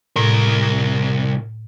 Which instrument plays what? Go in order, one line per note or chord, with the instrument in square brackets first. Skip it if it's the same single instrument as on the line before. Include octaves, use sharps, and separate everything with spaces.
[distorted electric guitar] C2 A#4 [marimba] A2